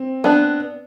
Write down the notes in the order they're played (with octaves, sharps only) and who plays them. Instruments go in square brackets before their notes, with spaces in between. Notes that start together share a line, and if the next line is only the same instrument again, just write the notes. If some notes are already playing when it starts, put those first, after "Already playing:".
Already playing: [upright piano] C4
[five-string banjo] B3 D4